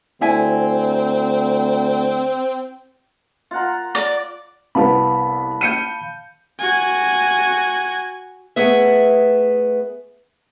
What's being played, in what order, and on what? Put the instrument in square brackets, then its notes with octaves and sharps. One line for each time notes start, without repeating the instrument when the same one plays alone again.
[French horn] D2 [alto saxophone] C4 [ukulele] E4 E5 G#5
[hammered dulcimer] F4 F#5 A#5
[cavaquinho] D5
[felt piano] C2 B3 [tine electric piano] F5 A5 B5
[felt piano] G6 C#7 D#7
[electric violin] F#4 G#5
[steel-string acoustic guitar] A3 B3 G#4 E5